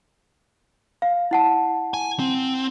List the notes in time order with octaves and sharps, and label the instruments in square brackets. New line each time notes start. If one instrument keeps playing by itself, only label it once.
[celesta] F5
E4 F#5 A5
[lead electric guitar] G#5
C4